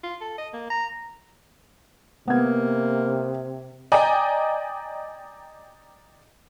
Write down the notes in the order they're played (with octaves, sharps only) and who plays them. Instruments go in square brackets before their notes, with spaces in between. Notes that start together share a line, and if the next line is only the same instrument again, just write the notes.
[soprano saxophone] F4
A4
D#5
A#3
A#5
[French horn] C3 [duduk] A#3 [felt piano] B3 G#6
[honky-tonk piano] D5 D#5 G5 G#5 A#5